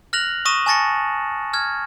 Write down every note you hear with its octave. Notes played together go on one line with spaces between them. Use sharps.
F6 F#6 A#6 F7 F#7
C#6 D#6 A#6 D#7 E7
G#5 A5 C#6 A6 A#6 C#7
F6 G#6